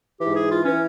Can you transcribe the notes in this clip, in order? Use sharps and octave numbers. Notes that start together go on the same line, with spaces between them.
G#2 E3 G4
G#4
F4
E3 C#4